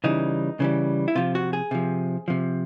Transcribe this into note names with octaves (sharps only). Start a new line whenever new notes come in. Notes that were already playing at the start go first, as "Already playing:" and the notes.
C#3 E3 G3 D#4
C#3 E3 G3
E4
C3 F3 F4
F#4
G#4
C3 F3
C3 F3